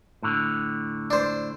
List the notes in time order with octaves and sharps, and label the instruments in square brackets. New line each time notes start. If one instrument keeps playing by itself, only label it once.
[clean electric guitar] A2 D3
[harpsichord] D4 C5